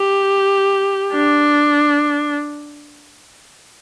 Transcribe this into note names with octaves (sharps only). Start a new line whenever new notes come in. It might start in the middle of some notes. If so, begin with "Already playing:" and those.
Already playing: G4
D4